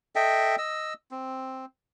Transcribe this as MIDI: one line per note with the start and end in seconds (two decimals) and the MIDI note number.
0.15 0.56 69
0.15 0.56 75
0.15 0.56 76
0.15 0.56 79
0.58 0.93 75
0.58 0.93 88
1.11 1.65 60